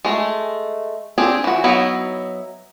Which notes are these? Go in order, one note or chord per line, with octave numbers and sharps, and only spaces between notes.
G#3 A3
C4 D4 G4 G#4
E3 F#4
F#3 B3 D#4 E4